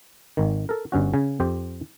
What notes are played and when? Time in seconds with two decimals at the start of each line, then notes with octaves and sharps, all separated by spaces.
0.37 G#1 D#3
0.69 A4 A#4
0.92 G1 G2 C#4 F#4
1.13 C#3 G#5
1.40 F2 G4 C5 G5